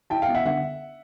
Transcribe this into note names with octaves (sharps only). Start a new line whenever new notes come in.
E4 G5 A5
F5 G5
B3
E5 F#5
D3 E5 F#5